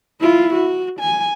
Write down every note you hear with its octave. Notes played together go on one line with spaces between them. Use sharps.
E4 F4
F#4
G#5